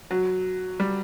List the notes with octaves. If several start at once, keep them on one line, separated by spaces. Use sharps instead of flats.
F#3
G3